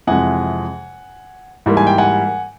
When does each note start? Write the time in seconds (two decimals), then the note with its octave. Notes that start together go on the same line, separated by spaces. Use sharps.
0.07 F2 C3 E3 G#3 F#5 G#5
1.66 G#2 E3 G3 A#3
1.77 G#5
1.87 G5
1.98 F#5 G#5